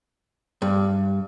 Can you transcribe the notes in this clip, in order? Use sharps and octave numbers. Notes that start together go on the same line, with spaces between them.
G2